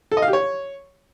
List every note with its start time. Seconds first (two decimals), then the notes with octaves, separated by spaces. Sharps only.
0.11 A4
0.17 D#5
0.22 F5
0.28 G4
0.33 C#5